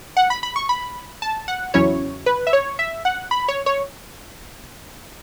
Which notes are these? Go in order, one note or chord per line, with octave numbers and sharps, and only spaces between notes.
F#5
B5
B5
C#6
B5
A5
F#5
E2 C#3 F#3 C#4 E4 C#5
B4
E5
C#5
E5
F#5
B5
C#5
C#5